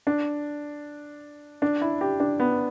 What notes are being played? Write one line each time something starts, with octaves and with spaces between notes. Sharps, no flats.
D4
D4
E4
G4
D4
B3